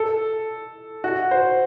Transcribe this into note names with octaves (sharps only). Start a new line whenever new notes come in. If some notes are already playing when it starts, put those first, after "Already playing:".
Already playing: A4
F#4
C5